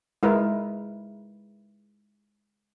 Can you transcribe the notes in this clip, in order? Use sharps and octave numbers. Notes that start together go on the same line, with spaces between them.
G#3 E4 A#4 B4